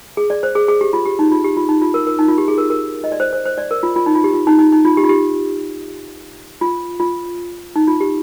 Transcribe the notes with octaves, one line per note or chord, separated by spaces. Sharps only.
G#4
D5
C5
G#4
G#4
G4
F4
G4
D#4
F4
G4
F4
D#4
F4
A#4
A#4
D#4
F4
G4
G#4
A#4
A#4
D#5
D5
C5
C5
C5
D5
A#4
F4
F4
D#4
F4
G4
F4
D#4
D#4
D#4
F4
G4
F4
G4
F4
F4
D#4
F4
G4